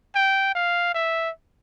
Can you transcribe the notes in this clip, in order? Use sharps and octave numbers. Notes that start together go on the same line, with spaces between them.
G5
F5
E5